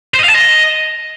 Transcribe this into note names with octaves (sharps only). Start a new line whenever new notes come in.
C5
D#5
F5
A5
D#5